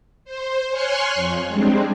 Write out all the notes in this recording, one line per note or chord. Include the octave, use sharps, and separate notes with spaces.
C5
C#5 G#5 C6 C#6 F6 F#6
F2
G3 G#3 C4 D4